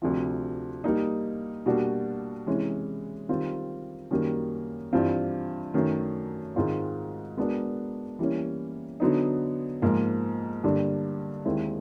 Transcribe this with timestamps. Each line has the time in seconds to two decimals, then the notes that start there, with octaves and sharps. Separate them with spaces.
0.02 D2 C3 F3
0.84 G3 A#3 D#4
1.66 B2 G3 A#3 D4 F#4
2.47 C3 E3 G#3 C#4
3.29 D#3 G3 C4 F4
4.11 F#2 D#3 G3 A#3
4.93 G2 E3 G3 C4 F4
5.74 F#2 D#3 F#3 A3
6.56 G#2 D#3 G#3 C4 F4
7.37 G#3 B3 D4 F#4 A#4
8.19 E3 G3 A#3 C#4
9.00 D3 F#3 B3 D#4
9.82 G#2 F3 A#3
10.63 G2 D3 G3 A#3 D4
11.45 D#2 D#3 G#3 C4 E4